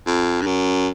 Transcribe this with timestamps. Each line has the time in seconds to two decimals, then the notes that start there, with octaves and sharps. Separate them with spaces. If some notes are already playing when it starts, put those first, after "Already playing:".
0.07 F2
0.41 G2
0.46 F#2